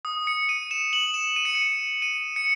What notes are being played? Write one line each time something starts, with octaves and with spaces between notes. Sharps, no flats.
D#6
C#7
D#7
E7
F#7
E7
D#7
C#7
D#7
D#7
C#7